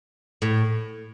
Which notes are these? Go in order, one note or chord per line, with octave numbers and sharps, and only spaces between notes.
A2